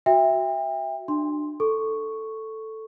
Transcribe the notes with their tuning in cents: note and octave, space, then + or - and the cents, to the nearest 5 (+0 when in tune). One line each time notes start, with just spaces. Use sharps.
F#4 +5 E5 +0 G5 +30
D4 +25 C6 +0
A4 +0 C#6 +0